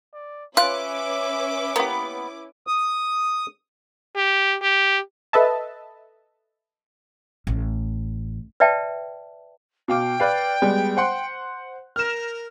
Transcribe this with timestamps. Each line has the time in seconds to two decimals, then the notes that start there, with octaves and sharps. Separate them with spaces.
0.14 D5
0.57 C#4 F4 B4 E5 D6 F#6
1.76 A#3 B3 E4 G4
2.67 D#6
4.16 G4
4.62 G4
5.33 A4 B4 D#5 E5 A5
7.47 A1
8.60 B4 D5 E5 G5 A5
9.88 B2 F5 G5 D6
10.20 B4 D5 F5
10.62 G3 G#3 B3
10.97 C5 F#5 C6
11.96 A#4 F6 E7